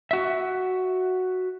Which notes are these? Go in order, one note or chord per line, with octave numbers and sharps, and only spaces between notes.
F#4 E5